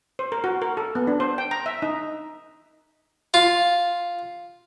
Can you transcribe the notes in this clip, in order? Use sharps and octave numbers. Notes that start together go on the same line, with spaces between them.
C5
A#4
F#4
A#4
A4
B3
D4
C5
G5
A#5
E5
D#4
F4